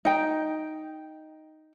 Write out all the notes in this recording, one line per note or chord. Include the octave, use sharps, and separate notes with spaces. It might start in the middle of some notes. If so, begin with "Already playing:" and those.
D#4 G5